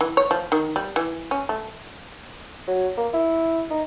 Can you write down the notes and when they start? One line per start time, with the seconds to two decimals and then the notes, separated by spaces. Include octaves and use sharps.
0.01 E3
0.17 C#5
0.31 F3
0.52 D#3
0.76 G3
0.96 E3
1.31 C#4
1.49 A3
2.67 F#3
2.97 A#3
3.13 E4
3.70 D#4